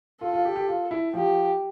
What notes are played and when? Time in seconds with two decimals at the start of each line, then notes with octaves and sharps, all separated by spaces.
0.21 F4 A4
0.33 F4
0.45 G4
0.56 G4
0.68 F4
0.91 E4
1.14 F3 G4